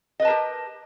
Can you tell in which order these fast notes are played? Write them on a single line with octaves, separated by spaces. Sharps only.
D#5 B4 A5 A#4 G4